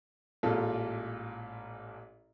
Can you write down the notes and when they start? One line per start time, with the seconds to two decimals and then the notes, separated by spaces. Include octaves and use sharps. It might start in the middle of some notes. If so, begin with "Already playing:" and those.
0.43 A1 A#2 G#3 F4 A4